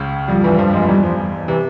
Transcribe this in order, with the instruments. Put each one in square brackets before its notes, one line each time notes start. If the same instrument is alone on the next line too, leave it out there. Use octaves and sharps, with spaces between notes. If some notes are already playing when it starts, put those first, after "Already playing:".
Already playing: [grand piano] C#2 C#3
[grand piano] F2 F3 [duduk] G3
[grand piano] G2 G3 [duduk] E3
[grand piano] G2 G3 [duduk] F3
[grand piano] F2 F3 [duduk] G#3
[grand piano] E2 E3 [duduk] G3
[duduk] F3
[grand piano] C3 [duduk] E3